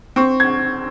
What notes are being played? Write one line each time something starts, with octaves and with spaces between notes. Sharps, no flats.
C4 C#6
G#6